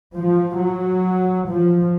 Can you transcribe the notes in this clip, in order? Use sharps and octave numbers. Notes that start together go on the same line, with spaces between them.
F3
F#3
F3